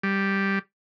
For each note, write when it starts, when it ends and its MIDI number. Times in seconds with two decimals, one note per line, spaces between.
0.03 0.59 55